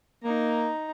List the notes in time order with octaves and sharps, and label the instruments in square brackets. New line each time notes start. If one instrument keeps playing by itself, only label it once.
[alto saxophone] A#3 [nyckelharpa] D#4 A#5